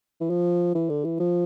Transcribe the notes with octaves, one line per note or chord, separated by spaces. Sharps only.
E3
F3
E3
D3
E3
F3